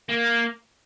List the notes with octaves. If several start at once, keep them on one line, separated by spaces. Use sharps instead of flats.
A#3